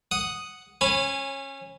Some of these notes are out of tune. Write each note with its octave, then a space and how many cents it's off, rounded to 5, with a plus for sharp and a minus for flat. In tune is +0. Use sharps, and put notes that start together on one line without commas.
F#5 +0 D#6 +0
C#4 -20 G#5 +0 B5 +10